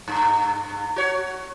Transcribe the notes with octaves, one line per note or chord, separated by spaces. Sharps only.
G2
F#4 C#5